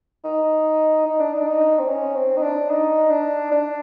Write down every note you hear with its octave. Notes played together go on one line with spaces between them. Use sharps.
D#4
D#4
D4
D#4
D4
D#4
C4
C#4
C4
D#4
D4
D#4
D4
D4